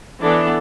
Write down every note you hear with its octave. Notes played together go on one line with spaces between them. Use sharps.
E3 B3 D4 A4 D5